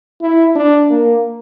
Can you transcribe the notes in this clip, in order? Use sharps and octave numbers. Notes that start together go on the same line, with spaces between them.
E4
D4
A#3